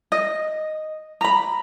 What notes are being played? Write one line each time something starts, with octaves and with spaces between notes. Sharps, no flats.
D#5
A#5 B5